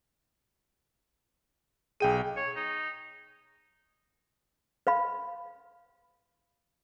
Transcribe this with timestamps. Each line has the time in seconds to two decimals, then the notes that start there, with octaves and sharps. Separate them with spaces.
2.00 B1 G#4 G5 D#7
2.37 C#5
2.56 D#4
4.87 B4 F5 B5